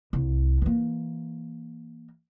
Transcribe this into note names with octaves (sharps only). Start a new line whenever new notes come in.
C2
E3 A#3